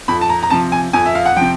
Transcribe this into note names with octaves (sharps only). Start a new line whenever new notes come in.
F2 B5
A5
A#5
A#5
C3 F3 A5
G#5
F2 G#5
E5
F5
F#5
C3 F3 G5